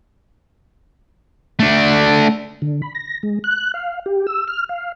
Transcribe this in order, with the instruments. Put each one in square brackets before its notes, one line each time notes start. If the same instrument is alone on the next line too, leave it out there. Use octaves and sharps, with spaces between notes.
[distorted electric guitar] A3 D4
[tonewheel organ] D3
B5
A#6
G#3
F#6
F5
G4
E6
F6
F5